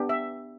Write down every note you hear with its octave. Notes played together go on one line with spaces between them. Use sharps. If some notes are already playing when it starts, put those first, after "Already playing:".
Already playing: B3 D4 G4
E5